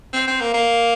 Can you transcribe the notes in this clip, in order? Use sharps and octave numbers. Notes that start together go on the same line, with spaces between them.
C4
C4
A#3
A#3